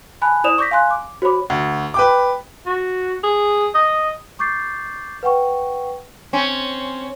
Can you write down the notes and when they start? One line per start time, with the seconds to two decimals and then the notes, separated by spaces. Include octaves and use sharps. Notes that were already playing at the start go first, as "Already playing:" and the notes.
0.22 G#5 A5 B5 F#6
0.44 E4 C5 D5 D#6 E7 F7
0.58 C#6 D6 G6 A#6 B6
0.71 F5 G#5 C6 F#6
0.91 D6
1.22 F#4 C5 C#5 B5 D6
1.50 D2
1.94 B4 G5 D6
2.66 F#4
3.23 G#4
3.75 D#5
4.39 C#6 D6 G6 A6 C7
5.23 B4 F#5 G5 C#6
6.33 C4 C#4